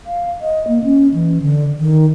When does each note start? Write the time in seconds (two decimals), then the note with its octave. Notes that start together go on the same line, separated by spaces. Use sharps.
0.06 F5
0.41 D#5
0.68 A#3
0.84 C#4
1.14 E3
1.42 D3
1.78 D#3